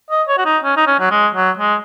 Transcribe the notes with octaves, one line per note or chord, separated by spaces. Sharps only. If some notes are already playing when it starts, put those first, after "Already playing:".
D#5
C#5
F#4
D#4
C#4
D#4
C#4
F#3
G#3
F#3
G#3